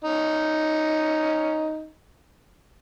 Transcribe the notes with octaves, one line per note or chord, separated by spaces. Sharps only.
C#4 D#4